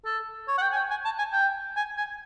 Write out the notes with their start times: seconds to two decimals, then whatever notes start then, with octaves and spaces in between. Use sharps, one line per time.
0.05 A4
0.48 C#5
0.58 F#5
0.62 G5
0.72 G#5
0.76 G5
0.90 G#5
1.05 A5
1.18 G#5
1.33 G5
1.76 G#5
1.97 G#5